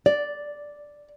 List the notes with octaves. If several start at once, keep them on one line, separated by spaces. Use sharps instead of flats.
D5